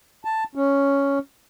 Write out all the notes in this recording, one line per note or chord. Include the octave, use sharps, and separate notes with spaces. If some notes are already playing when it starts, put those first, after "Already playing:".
A5
C#4